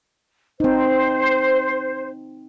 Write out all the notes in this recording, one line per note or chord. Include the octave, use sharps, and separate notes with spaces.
C4 D#4 C5